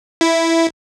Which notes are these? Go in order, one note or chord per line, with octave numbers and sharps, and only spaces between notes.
E4